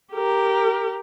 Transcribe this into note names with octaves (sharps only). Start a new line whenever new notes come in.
G4 A#4